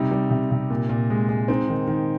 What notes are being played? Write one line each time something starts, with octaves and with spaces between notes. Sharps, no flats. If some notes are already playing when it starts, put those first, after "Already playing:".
Already playing: C3 G3 D#4
G3
C3
C3
A#2
A#2
G#3
G#3
C4 D#4
D#3
D#3